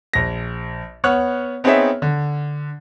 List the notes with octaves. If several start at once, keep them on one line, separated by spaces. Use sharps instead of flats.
A#1 A#6
B3 C#5 F#5 C#6 F6 F#6
B3 C4 D#4 G#4 C#5 E5
D3